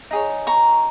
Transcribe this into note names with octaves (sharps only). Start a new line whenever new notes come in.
D#4 G#4 C#5
A#5 C#6